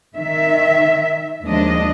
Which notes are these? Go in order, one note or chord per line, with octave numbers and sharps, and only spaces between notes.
D#3 E5
D#2 F3 G#3 D4 D#5